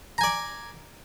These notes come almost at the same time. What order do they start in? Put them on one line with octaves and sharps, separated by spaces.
A#5 G#5 D5